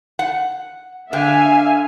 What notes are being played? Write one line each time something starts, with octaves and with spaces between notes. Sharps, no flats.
F#5
D3 E5 F5 G#5